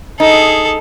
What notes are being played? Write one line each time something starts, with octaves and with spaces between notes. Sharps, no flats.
D#4 G#4 A4